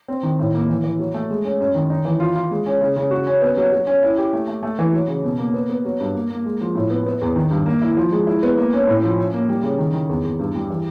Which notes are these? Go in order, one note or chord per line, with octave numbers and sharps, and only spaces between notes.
C4
D#3
A2
A#3
E3
E3
F#3
A3
G#3
C#4
F#2
D#3
D#4
E3
F4
F4
G#3
C#4
C#3
C#3
F#4
C#4
B3
F#3
F#3
C#4
E4
G4
A3
A3
A3
E3
F#3
C#3
B2
A#3
B3
B3
F#3
G2
A#3
A#3
G#3
F3
A2
B3
B3
E2
D#3
G2
A#3
E4
F3
G#3
E4
B3
A#3
C#4
A2
F3
C#4
A#3
G3
C#3
D#3
D#3
E2
E2
G2
G3
E3